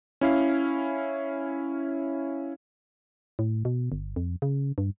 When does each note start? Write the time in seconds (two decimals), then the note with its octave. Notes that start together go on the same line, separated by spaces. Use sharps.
0.21 C#4 E4 F5
3.39 A2
3.65 B2
3.92 G1
4.16 F2
4.42 C#3
4.78 G2